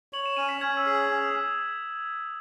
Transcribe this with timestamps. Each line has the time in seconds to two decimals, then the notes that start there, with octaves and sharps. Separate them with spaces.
0.13 C#5 F#7
0.26 E7
0.37 C#4 D#7
0.49 B6
0.61 C#4 G#6
0.77 E6
0.86 G#4
0.94 D#6
1.09 C#4 D#6